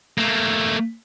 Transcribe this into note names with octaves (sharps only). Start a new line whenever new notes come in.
A3 A#3